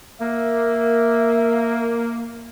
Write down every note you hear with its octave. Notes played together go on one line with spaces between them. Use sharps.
A#3 E5